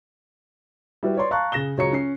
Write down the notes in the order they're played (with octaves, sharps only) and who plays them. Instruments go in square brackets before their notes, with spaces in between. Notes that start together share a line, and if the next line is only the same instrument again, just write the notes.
[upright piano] G3 E4 F#4 B4
B4 C#5 D5 C6
F5 A5 A#5 C#6 F#6
C#3 G#4 A#6 E7 G7
C#2 C#3 F#3 C#5 A#5 C#7
C#4 C7